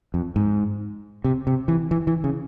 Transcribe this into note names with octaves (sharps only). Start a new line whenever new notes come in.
F2
G#2
C3
C3
E3
E3
E3
C#3